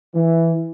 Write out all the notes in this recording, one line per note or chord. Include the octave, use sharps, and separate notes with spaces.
E3